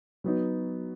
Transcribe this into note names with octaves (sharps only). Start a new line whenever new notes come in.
F#3 B3 D#4